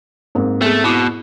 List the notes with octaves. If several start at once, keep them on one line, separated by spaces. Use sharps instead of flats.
G#2 A#3 C4
A3 B3 G#4
B2 E4 D6